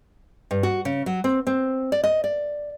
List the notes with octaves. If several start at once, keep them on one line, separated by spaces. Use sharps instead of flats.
G2
F#4
C#3
F#3
C4
C4
D5
D#5
D5